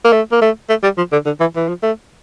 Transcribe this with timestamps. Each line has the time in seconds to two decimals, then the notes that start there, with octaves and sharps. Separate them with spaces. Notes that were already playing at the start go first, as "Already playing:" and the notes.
0.04 A#3
0.12 A3
0.32 A#3
0.41 A3
0.69 A3
0.83 G3
0.97 F3
1.12 D3
1.26 D3
1.40 E3
1.56 E3
1.68 F3
1.82 A3